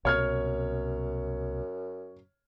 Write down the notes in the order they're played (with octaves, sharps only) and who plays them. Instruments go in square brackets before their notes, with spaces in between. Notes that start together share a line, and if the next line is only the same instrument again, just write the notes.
[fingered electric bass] C2 B2 [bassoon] F#2 [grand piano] C#5 F6 G#6